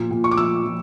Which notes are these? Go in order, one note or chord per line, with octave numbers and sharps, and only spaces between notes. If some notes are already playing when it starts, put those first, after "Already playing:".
Already playing: A#2 F3
A#2
C#6
D6
F3 E6
F3